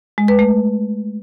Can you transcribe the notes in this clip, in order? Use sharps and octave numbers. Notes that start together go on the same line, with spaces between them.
G#3
B4
A3